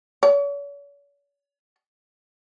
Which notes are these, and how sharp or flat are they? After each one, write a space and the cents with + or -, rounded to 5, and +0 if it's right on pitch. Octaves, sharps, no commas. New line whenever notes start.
C#5 +45